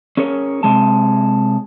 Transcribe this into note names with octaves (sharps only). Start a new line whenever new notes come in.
C#4 G#4 A#4 C#5
C3 G#3 A5